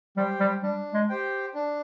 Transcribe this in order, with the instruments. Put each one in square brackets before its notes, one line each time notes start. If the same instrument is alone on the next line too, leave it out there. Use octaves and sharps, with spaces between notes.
[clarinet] G3 [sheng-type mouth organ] G4 C5 G5
[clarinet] G3
[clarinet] G3 [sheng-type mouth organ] D4
[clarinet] G#3
[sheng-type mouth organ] G4 C5 G5
D4